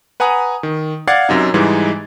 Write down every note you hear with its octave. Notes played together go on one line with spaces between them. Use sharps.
B4 F#5 G#5 A#5 D#6
D#3
D5 F5 F#5 G#6 A6 C7
F#2 C3 D#4
G#2 E3 G3 G#3 D#4